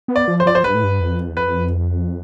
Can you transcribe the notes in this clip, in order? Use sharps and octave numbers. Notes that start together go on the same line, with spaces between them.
B3
D5
F3
C5
F3 D5
C5
G2 B4
A2
G2
F2
E2
F2 B4